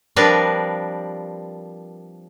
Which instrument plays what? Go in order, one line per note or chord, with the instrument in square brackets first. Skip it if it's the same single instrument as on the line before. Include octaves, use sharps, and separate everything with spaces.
[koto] F3 G3 C4 D4 A#4 B4